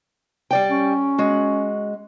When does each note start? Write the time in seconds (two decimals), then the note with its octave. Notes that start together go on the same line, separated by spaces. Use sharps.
0.51 G3 D5 G5
0.70 C#4
1.18 G#3 F#4